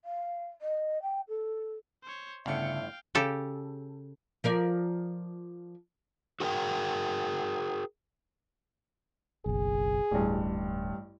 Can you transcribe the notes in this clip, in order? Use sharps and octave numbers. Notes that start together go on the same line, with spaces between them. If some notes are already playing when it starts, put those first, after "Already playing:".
F5
D#5
G5
A4
C5 C#5
G1 A2 C#3 E5 F5 G5 A5 C#7
C#3 G4 A4
F3 A#4 D5
F#4 G#4 A#4 D#5 G5
F#1 B1 G#4
D1 A1 G2